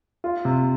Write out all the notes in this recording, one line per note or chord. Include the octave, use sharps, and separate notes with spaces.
F4
C3